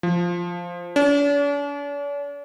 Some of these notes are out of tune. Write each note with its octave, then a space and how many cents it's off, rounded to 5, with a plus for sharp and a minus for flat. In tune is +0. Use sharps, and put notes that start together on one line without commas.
F3 -5
D4 -45